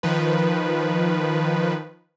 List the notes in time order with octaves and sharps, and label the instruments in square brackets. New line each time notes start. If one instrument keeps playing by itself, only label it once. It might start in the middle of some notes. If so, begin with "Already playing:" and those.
[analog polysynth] D#3 F3 B4